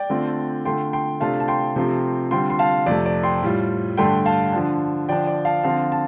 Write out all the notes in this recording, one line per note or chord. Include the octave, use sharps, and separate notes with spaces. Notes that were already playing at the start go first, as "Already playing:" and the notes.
Already playing: D5 G5
D3 A3 C4 F4
D3 A3 F4 G5 C6
G5 C6
C3 A3 D4 F4 F5 A5
A5
G5 C6
C3 F3 A3 C4 F4
D3 G3 C4 F4 G5 C6
C6
F5 A5
F2 C3 A3 D5
D5
G5 C6
A2 G3 F4
G2 D3 A3 D4 G5 C6
F5 A5
D3 F3 D4
D3 F3 D4 D5 G5
D5
F5 A5
D3 F3 C4 F4 F5 A5
A5